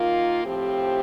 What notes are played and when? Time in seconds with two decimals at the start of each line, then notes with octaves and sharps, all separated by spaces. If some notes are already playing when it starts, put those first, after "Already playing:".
Already playing: D#3 A#3 F4
0.43 A2 F3 C4 G4